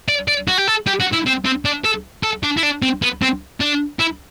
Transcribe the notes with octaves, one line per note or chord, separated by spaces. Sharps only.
D5
D5
F#4
G4
A4
G4
F#4
E4
C4
C4
D4
A4
A4
D4
E4
D4
C4
B3
C4
D4
E4